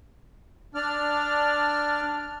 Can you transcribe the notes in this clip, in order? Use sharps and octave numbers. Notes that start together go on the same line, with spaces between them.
D4 D5 F6